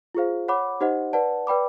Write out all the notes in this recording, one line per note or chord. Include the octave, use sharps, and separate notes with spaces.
F4 G#4 C5 F5
C#5 F#5 B5 D6
D#4 G4 C5 D#5 F#5
B4 D5 F#5 A5
B4 D5 G5 B5 D6